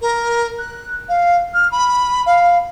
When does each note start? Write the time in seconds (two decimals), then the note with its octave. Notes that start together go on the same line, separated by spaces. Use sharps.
0.01 A#4
0.58 F#6
1.08 F5
1.54 F6
1.71 B5
2.26 F5